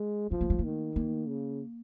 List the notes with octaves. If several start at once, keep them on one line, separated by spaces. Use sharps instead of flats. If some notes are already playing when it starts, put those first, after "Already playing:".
Already playing: G#3
F3 C4
A#3
G#3
A#3
D#3
A#3
C#3